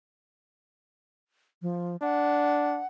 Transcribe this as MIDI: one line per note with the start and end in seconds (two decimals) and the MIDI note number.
1.62 1.96 53
2.02 2.82 62
2.02 2.87 78